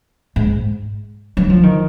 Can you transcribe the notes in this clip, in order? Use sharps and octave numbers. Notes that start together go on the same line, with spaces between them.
G#2
F#3
F3
D#3